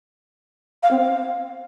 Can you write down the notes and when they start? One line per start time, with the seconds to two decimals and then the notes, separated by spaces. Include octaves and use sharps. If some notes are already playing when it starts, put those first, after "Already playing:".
0.83 F5
0.91 C4
0.99 F5